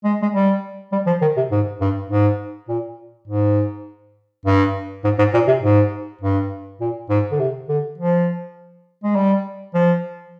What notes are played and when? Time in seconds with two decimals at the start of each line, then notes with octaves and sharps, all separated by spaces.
0.04 G#3
0.22 G#3
0.33 G3
0.92 G3
1.07 F3
1.22 D#3
1.37 C3
1.51 G#2
1.81 G2
2.10 G#2
2.68 A#2
3.27 G#2
4.45 G2
5.04 G#2
5.18 G#2
5.34 A#2
5.48 C3
5.62 G#2
6.21 G2
6.81 A#2
7.10 G#2
7.32 D3
7.39 C3
7.68 D3
7.98 F3
9.04 G#3
9.15 G3
9.74 F3